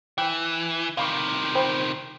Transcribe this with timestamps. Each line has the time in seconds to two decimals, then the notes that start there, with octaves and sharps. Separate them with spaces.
0.18 E3 G5
0.97 C3 D#3 F5 B5 C#6
1.55 C5 G5 B5